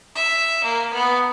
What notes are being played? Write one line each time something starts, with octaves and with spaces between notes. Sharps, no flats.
E5
A#3
B3